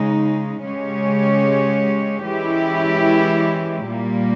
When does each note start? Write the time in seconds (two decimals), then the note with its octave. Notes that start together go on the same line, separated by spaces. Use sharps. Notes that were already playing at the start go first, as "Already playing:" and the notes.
Already playing: C#3 G#3 D#4
0.65 C#3 G#3 C#4 G4 C#5
2.26 E3 G#3 C#4 E4 G4
3.87 A#2 G3 A#3